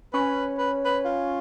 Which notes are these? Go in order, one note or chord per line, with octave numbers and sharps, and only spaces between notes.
C#4 B4
B4
B4
F4